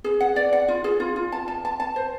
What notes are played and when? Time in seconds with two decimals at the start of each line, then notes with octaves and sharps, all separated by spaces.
0.04 G#4
0.21 F#5
0.36 D5
0.53 F#5
0.68 F4
0.84 G#4
1.00 F4
1.16 F4
1.32 A5
1.48 A5
1.65 A5
1.80 A5
1.96 C5